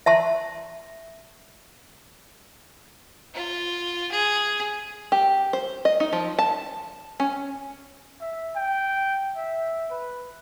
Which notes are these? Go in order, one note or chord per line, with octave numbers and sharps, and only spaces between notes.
E5 A5 C6
F4
G#4
G4
C5
D#5
D#4
F3
A5
C#4
E5
G5
E5
B4